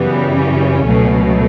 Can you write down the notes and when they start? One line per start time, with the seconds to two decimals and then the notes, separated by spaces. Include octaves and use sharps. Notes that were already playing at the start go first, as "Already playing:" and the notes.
Already playing: F#2 C#3 E3 G3 B3
0.36 C#4
0.87 C#2 B2 F#3 A3